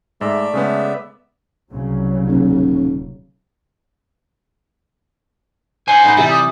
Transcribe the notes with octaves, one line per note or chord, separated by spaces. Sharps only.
G#2 A3 D5 E5
C#3 G#3 B3
C2 C#3 F#3
D#1
C5 F#5 G#5
D#4 G5 B5
C3 E3 G3 A4
D6 D#6